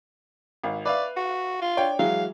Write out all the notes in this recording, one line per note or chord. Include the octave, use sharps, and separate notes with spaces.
G#1 F5
B4 D5 E5 F5
F#4
F4
D4 C#5 G5
E3 F#3 G#3 F5